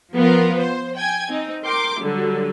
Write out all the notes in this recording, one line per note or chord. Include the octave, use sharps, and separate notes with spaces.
F3 B3 F4 A#4
C5
G5 G#5 G#6
C4 D#4
A#4 G5 C6 D6
D3 F#3 G3